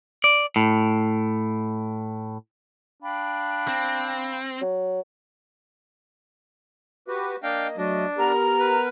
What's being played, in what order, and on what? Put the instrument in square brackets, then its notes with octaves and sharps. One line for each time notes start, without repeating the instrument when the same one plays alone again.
[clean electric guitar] D5
A2
[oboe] D4 [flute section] F5 G5 B5
[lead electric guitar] C4
[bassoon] F#3
[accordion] F#4 G4 B4
[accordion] A#3 D#5 [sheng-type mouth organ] D4 F5 G5
[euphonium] F#3 [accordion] A3 D#5 [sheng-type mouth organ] D4
[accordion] B3 A#4 [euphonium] G4 [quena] A#5
[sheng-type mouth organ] B4